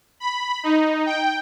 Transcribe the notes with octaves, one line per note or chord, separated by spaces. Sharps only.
B5
D#4
G5